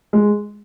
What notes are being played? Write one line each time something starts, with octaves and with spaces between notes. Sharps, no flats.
G#3